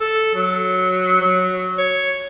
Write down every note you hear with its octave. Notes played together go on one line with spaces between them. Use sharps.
A4
F#3
F#3
C#5